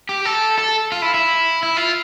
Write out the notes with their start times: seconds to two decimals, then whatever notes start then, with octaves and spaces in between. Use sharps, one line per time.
0.09 G4
0.25 A4
0.58 A4
0.92 F4
1.02 E4
1.14 E4
1.63 E4
1.77 F4